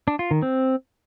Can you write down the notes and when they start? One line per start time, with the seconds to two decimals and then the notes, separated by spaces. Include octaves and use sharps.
0.08 D4
0.19 F4
0.31 D#3
0.42 C4